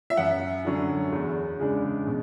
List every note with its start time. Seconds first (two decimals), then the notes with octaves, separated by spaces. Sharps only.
0.10 E5
0.17 F#2 F#5
0.65 D3 F#3 C#4
1.12 E2
1.59 C#3 G#3 D4
2.07 B2